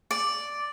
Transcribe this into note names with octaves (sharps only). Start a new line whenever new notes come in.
D5